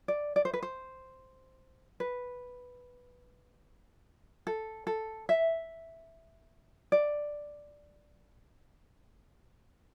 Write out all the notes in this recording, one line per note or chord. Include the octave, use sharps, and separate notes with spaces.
D5
D5
C5
B4
C5
B4
A4
A4
E5
D5